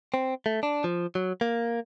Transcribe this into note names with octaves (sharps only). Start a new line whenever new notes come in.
C4
A3
D4
F3
F#3
A#3